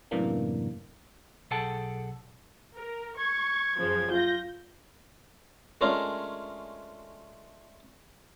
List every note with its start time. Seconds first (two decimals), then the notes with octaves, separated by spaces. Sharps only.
0.11 F#2 A2 C3 E3 A#3 D4
1.51 B1 G#4 A4 F#5 G5 A5
2.74 A#4
3.17 C#6 G#6
3.78 F#2 C#3 F3
4.10 F4 G6 A#6
5.81 G#3 A3 C#4 D4 F4 A#4